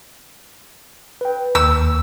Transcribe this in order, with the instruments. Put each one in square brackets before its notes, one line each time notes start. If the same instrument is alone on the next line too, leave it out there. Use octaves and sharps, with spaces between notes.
[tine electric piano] B4 G5
[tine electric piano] D#2 [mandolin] E6